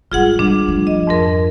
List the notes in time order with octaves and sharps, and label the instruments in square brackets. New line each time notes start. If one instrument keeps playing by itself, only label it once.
[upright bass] G#1 G3 [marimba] F4 G#4 F#5
[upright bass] G#2 G3 [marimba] D4
[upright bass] F3 A3
[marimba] D#5
F2 G#2 A#4